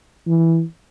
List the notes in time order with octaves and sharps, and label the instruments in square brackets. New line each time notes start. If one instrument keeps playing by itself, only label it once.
[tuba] E3